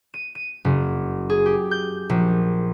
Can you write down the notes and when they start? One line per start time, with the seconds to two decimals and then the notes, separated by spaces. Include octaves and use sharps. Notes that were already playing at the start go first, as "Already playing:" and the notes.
0.14 D#7
0.35 D#7
0.65 F#1
1.30 G#4
1.46 G4
1.71 G6
2.10 A#1